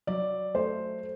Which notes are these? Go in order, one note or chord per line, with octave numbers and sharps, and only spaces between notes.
F#3 D5
A3 C5